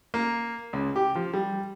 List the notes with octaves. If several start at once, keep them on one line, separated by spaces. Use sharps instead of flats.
A#3
C#2
G4
F3
G3